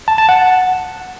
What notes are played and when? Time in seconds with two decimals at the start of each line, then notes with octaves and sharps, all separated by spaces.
0.08 A5
0.18 A5
0.29 F#5